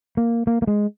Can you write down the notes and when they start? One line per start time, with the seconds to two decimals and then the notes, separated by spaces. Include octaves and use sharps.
0.17 A#3
0.47 A#3
0.62 A#3
0.67 G#3